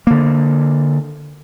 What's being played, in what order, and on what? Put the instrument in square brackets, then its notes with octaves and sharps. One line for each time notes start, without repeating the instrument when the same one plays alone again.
[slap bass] D3 A#3